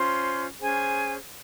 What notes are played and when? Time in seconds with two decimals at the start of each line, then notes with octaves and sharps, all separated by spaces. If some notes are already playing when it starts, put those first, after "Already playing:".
Already playing: C#4 F4 C5 C6
0.60 C#4 G#4 C5 G#5